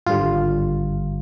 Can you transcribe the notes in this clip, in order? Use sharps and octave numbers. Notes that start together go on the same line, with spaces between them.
G#1 G2 D3 G3 F4